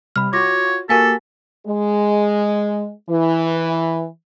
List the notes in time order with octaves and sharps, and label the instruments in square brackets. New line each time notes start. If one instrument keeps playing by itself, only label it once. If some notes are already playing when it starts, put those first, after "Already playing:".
[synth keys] C3 G3 [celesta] B5 F6
[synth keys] F4 F#4 [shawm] C#5 [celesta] D6 A#6
[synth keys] A#3 F#4 G4 [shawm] A4 [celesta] A#4 G#5 B6
[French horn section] G#3
E3